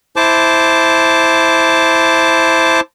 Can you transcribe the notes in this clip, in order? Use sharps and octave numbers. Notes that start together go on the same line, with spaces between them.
E4 C5 A5 D6